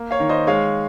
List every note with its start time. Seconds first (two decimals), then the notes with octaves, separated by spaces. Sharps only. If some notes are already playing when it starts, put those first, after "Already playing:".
Already playing: A#3
0.11 C#5 F5
0.20 D#3
0.29 C5 D#5
0.47 G#3 C#5 F5